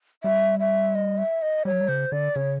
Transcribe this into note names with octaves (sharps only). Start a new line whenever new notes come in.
G3 E5
E5
D#5
E5
D#5
G3 C#5
F#3
G3
C#3 C5
D3 D5
C#3 C#5